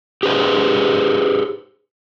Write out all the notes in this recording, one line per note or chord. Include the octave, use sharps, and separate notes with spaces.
G4 G#4 B4 C5